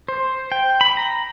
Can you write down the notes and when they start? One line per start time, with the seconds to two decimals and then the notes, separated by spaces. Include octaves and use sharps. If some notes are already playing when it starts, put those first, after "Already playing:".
0.08 C5
0.52 G5
0.81 B5
0.97 A#5